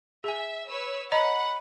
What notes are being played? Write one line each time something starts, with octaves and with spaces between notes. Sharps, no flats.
G#4 E5 G#5
B4 C#5 E6
C#5 D#5 F#5 A#5 B5